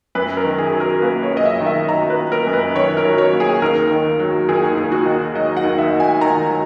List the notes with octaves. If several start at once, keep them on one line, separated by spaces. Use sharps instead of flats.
F#2 B4
A#4
D#3
G#4
F#3
A#4
A#3 B4
C#5
F#2
D#5
E5
D#3
E5
F#3 A#5
B4
A#3
A#4
F#2
B4
D#3 C#5
A#4
F#3
C#5
A#3
G#4
D#2 A#4
D#3
F#3
D#2 G#4
D#2
F#4
D#3
F#3 D#5
F#5
D#2
E5
D#2
G#5
D#3 A#5
F#3